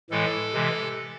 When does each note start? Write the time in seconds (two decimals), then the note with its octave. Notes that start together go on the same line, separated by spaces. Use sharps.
0.10 A2 E3 G#3 A4
0.53 C3 E3 G#3